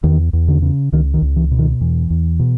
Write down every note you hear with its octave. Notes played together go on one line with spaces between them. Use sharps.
E2 D#3
E2
D3
C#3
C#2 D#3
D#3
C#2
E3
B2
D#3
E2 E3
E2
B2